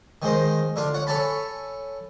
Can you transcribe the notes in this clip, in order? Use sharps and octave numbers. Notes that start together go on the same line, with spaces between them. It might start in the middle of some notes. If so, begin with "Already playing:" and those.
D#3 G#3 C5 D#5
D3 D4 F4
C#5 F#5
A4 C#5 G#5 A5 B5